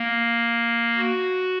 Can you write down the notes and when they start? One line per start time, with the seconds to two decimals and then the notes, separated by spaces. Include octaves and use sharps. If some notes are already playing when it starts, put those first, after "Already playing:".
Already playing: A#3
0.97 F#4